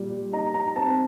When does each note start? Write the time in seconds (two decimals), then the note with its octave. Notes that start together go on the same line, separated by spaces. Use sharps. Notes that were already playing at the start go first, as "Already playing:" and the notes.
Already playing: A#2 G3
0.32 D#4 A#5
0.54 A#5
0.76 C4 A5